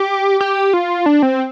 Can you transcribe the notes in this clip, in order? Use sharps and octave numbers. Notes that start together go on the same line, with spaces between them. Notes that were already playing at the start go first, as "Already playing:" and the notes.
Already playing: G4
G4
F4
D4
C4